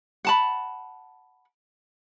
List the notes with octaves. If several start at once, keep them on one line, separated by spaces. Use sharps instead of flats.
F#5 A5 B5